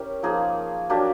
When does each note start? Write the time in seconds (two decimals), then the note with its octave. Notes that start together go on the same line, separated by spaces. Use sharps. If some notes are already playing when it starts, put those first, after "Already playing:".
Already playing: C#4 E4 G4 A#4
0.23 F3 A#3 D#4 G#4
0.90 F#3 A#3 D4 G4